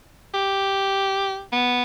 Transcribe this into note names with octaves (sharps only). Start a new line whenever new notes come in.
G4
B3